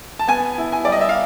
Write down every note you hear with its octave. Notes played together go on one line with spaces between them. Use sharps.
A5
B3 G#5
E4
G#5
G3 D5
D#5
E5
F5